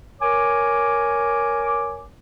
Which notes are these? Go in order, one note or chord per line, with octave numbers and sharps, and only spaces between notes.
A#4 C#5 G#5 D6